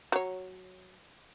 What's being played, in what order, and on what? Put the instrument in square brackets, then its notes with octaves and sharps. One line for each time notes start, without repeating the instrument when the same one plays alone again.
[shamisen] F#3 C#5